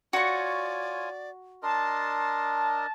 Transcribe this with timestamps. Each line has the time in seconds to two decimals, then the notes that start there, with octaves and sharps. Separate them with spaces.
0.13 F4 F#4 C#5 D5 G#5 C#6
1.63 D4 A#4 D#5 A5 C6